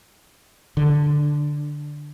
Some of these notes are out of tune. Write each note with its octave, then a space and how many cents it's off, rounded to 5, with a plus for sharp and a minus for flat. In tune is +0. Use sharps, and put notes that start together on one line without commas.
D3 +5